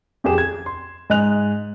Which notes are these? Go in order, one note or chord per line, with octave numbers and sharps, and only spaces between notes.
F2 G4 G#4 E7
G#6
C6
G#2 D#5 G#5 F#6 F7